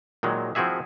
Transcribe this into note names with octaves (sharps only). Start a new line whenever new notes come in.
A#2 D#3 F#3 G#3
F3 C4 E4 F#4 G#4 E5